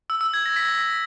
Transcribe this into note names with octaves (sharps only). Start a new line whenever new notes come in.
E6
E6
G#6
A#6
B6
A#6